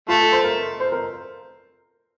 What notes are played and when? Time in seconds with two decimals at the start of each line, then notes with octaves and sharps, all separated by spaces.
0.08 A3 F4
0.20 A4
0.32 C5
0.44 A#4
0.80 C5
0.92 A#4